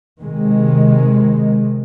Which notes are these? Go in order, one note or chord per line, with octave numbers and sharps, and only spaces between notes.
C3 D#3 G#3